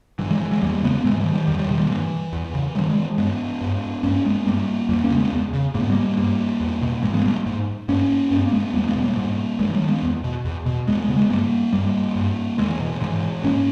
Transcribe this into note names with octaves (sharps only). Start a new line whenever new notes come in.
G2 E3
E3 G#3
E3
E3 G#3
E2 G3 A#3
C#3 G#3 B3
G#2 E3 G#3
D#3 G3
D#3 G3
E2 D#3 G3
D#3 G3
B2 D#3 G3
G3 A#3
G2 E3
E2
C#3
G2 D#3 G3
E3 G#3
G2 G#3 B3
G2
G2 A#3 C#4
G#3 B3
G2 G3 A#3
E2 G3 A#3
A#3 C#4
C#3
G#3 B3
E2
C#3
G#2 A#3
B3
G3 A#3
G2 G3 A#3
E2
B2
G#2 E3 G#3
G#3 B3
G3 A#3
G#2
G2 A#3 C#4
G2 C#4
B3
A#3
G#3 B3
E2 G3 A#3
G#3 B3
B2
G3 A#3
G#2
G2 E3 G#3
D#3 G3
G#3 B3
E2
B2
E2
B2
E2 G#3 B3
G#3 B3
C#3
G#3 B3
G2 G3 A#3
G2 G3 A#3
G2
E2 E3 G#3
B2
G#2 E3 G#3
G#2 A#3 C#4